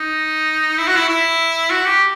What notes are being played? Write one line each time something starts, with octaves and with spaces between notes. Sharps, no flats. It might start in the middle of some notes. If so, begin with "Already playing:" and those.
Already playing: D#4
E4
F#4
E4
E4
F#4
G4